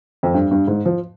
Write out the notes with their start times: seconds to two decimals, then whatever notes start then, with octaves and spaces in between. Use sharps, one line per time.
0.23 F2
0.34 G2
0.51 G2
0.68 G#2
0.86 F3